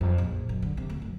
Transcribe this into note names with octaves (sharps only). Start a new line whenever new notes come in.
F2
A#1
F#2
D3
C3
D2
F#2